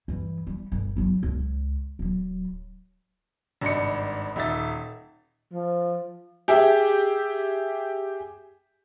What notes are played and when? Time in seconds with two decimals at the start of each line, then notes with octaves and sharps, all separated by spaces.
0.08 G2 E3
0.47 G3
0.72 G1
0.97 F#3 C#4
1.23 C#2
1.99 D1 F#3
3.61 G#1 G2 D5 D#5 C#7
4.36 D#1 D#4 E5 A6
5.54 F3
6.48 G4 G#4 E5 G5